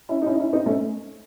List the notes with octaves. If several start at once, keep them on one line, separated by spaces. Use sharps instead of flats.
C#4 E4
D#4
C#4 E4
D#4
C#4 E4
C4 D#4
A3 C#4